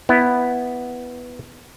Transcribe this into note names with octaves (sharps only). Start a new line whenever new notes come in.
B3 E4